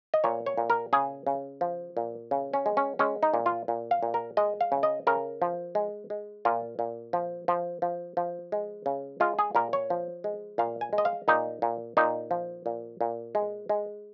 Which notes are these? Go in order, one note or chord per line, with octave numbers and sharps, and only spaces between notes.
D#5
A#2 C#5
C#5
A#2
A#4
C#3 G#4
C#3
F3
A#2
C#3
C#4
G#3
C#4
G#3 C#4
D#4
A#2
F4
A#2
F5
A#2
A#4
G#3 D#5
F5
C#3
D#5
C#3 A#4
F3
G#3
G#3
A#2 F4
A#2
F3
F3
F3
F3
G#3
C#3
G#3 F4
G#4
A#2 A#4
C#5
F3
G#3
A#2 F5
G#5
G#3
D#5
F5
A#2 D#4
A#2
A#2 D#4
F3
A#2
A#2
G#3
G#3